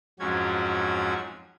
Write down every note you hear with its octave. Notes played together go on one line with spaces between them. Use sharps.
F2 G#2 F#3 C#4 F#4 G#6